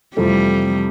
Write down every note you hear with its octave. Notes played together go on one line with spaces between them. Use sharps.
F2 C3 E3 G3 A3 C4